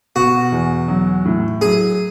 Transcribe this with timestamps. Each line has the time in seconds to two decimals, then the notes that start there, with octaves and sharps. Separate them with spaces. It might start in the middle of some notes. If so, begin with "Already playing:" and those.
0.16 B2 F#4
0.52 E2
0.88 F#3
1.25 A2
1.61 F#3 G#4